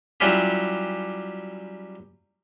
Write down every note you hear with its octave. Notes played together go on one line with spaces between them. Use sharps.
F#3 G3 C#4 E4 F4 G4